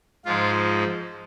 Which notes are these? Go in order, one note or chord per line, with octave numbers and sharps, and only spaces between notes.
G#2 F3 G#3 F4